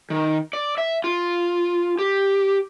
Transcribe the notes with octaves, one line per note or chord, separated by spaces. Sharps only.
D#3
D5
E5
F4
G4